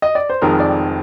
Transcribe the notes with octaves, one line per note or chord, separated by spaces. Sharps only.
D#5
D5
C5
F1 F2 D#3 G#3 A#4
D5